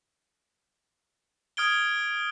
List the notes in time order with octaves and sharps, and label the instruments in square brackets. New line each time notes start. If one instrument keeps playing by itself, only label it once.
[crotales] D#6 F6 G#6 D7 G7